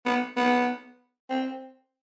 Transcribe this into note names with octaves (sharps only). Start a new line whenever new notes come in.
B3
B3
C4